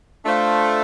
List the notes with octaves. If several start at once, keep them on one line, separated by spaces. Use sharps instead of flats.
A3 D4 F4 C5 F5